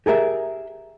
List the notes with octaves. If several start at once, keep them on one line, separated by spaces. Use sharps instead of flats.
G4 G#4 A#4 E5